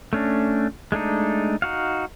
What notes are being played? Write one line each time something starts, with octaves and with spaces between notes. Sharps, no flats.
A3 C#4 D4
G#3 A3 D4 D#4
D#4 F#4 F5